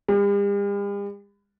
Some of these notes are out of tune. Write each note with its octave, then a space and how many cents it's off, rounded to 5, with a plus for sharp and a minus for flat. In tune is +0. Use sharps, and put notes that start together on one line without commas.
G3 +45